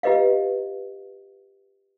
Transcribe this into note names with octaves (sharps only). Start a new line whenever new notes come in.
F4 G4 B4 D#5 F5